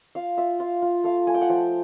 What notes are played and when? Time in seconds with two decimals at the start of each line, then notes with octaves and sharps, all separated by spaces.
0.15 F4 F5
0.37 F4 E5
0.60 F4 F5
0.82 F4
1.04 A3 F5
1.27 A3 G#5
1.35 G5
1.41 F#5
1.49 F3 G5